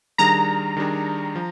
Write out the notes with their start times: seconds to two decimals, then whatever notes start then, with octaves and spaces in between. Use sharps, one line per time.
0.18 D#3 G3 D4 G#4 A#5
0.77 D#3 G3 D4 G#4
1.36 F3